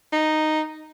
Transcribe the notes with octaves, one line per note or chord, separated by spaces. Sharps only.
D#4